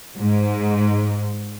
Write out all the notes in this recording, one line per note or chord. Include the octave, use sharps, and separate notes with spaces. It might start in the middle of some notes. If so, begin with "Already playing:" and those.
G#2